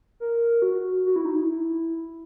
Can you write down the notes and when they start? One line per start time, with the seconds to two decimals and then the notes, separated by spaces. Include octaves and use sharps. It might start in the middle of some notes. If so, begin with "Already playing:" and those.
0.20 A#4
0.62 F#4
1.06 F#4
1.16 E4
1.25 D#4
1.36 E4
1.49 E4